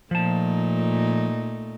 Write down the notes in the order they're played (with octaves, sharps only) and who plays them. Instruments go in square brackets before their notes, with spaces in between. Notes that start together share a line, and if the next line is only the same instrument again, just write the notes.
[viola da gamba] A#2 A3 D#4 [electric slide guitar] F3 A5